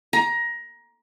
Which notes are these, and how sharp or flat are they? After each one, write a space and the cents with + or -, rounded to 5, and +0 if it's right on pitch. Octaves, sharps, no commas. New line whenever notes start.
A#5 +20